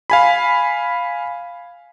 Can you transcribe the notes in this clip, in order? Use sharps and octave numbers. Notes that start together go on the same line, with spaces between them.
F5 G#5 B5